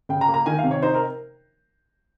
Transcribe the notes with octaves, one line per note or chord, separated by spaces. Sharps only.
C#3 G5
A#5
A#3
A#5
D#3 G#5
F5
C3
C#5
D#4 C5
A#4